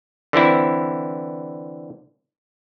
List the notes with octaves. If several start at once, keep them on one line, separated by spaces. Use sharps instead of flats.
D3 E3 C4 E4